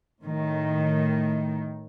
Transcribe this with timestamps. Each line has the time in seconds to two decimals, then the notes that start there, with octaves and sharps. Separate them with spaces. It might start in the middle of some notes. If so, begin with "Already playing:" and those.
0.23 A2 D#3